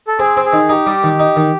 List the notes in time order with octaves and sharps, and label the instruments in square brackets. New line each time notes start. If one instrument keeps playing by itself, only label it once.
[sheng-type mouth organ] A4
[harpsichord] C4 [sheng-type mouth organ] G#4
[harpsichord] C4
[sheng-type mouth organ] G#4
[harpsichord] D#3
[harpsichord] D#4 [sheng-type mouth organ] G4
[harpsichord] G3
D#3
D#4
D#3